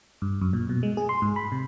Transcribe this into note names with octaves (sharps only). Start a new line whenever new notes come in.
G2
F#2
A#2
B2
G#3
G#4
C6
G#2
B5
C3